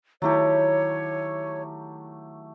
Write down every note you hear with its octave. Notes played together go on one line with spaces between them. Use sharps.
D#3 F#3 A3 D#4 E4 G4 C#5